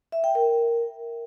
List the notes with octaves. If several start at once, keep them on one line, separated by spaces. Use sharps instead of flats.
E5
G5
A#4